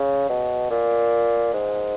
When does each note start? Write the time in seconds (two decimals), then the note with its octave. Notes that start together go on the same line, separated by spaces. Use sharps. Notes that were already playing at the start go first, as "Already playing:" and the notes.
Already playing: C#3
0.29 B2
0.71 A#2
1.53 G#2